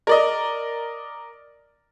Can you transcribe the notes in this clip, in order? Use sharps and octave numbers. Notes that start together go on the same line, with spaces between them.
A#4 D5 D#5